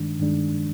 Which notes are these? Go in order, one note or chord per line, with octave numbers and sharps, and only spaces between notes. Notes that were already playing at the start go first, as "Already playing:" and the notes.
Already playing: G2 D#3 G#3 D4
G2 D#3 G#3 D4